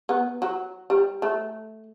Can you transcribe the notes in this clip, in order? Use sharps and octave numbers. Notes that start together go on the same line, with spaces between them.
B3
F#3
G3
A3